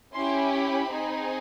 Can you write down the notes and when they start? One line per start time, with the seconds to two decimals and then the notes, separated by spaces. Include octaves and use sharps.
0.14 C#4 E4 G4 C6
0.52 B5
0.89 C4 D#4 G#4